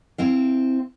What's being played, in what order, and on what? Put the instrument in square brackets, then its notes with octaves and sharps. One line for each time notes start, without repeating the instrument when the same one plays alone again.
[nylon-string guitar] C4 E4 F5